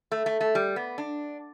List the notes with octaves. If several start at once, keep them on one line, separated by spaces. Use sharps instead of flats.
A3
A3
A3
G3
B3
D4